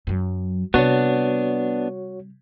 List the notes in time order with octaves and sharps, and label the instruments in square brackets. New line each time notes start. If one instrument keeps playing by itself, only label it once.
[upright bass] F#2 F#3
[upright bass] C3 G3 [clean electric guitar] B3 D4 [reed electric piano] F#4 C#5